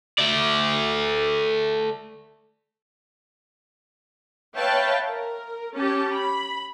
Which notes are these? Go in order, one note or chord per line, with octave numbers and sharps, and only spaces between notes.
A3 D5
B4 C#5 E5 F5 G5 A5
A#4
C#4 G4 A5
B5